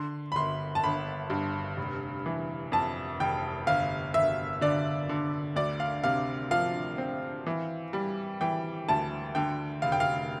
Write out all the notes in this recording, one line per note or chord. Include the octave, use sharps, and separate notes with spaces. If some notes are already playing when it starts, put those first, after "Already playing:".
Already playing: D3 C6
B5
G1 C6
A5
G1 B5
G2
F1
E3
F2 A5
F1 G5
G1 F5
G1 E5
D3 D5
D3
D2 D5
F5
C3 F5
F3 F5
C4
E3
G3
E3 G5
D2 A5
D3 G5
F1 F5
G5
F5